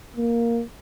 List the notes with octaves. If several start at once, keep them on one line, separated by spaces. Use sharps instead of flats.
A#3